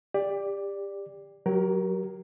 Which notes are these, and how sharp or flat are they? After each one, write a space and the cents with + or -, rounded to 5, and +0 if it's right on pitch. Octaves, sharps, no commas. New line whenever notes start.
G4 +25 D5 +0
F#3 +0 G4 -35 A#4 +15